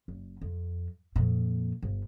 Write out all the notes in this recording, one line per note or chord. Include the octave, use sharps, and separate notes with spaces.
F#1
F2
F2 A#2
G1